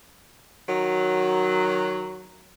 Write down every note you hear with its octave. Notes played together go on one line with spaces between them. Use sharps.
D#3 F#3